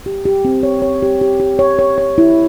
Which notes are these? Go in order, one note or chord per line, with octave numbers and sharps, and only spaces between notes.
G4
G4
C4
C#5
C#5
G4
G4
G4
C#5
C#5
C#5
E4